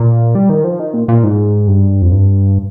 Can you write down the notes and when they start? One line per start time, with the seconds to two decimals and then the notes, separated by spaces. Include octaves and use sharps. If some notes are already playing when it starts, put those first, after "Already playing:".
Already playing: A#2
0.35 G3
0.49 D#3
0.64 F3
0.79 D#3
0.94 A#2
1.08 A#2
1.23 G#2
1.67 G2
2.02 F2
2.12 G2